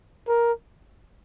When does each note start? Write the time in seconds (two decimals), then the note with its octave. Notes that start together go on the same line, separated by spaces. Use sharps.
0.28 A#4